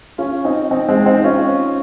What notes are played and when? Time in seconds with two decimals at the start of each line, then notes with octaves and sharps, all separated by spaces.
0.18 C#4 F4
0.45 C4 D#4
0.71 C4 D#4
0.89 G#3 C4
1.06 C4 D#4
1.24 C#4 F4